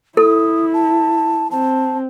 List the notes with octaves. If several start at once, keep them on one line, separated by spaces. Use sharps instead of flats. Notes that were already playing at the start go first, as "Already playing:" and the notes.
E4 A4 D#6
A5
C4 A5